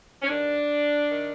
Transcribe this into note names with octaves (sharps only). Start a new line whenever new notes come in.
C#4
G2 D#3 D4
D#3